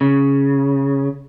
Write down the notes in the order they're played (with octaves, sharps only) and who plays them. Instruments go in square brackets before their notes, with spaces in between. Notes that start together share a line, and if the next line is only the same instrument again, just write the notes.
[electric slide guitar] C#3